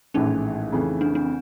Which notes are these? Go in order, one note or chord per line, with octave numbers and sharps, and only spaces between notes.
A#1 A2 E3 G#3 C#4 D#4
F2 C#3 E3 A3
C4 D4
C4 D4